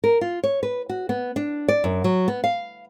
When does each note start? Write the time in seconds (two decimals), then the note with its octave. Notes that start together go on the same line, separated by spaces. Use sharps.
0.04 A#4
0.21 F4
0.43 C#5
0.63 B4
0.89 F#4
1.09 B3
1.36 D4
1.68 D5
1.84 F#2
2.04 F#3
2.28 B3
2.44 F5